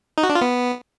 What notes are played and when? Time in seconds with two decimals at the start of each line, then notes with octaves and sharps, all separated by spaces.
0.18 D#4
0.24 F#4
0.29 D4
0.35 F4
0.41 B3